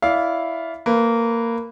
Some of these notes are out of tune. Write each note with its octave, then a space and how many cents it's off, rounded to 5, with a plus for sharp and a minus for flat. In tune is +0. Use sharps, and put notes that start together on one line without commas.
E4 +0 D5 -25 F5 +0
A#3 -15 B4 +0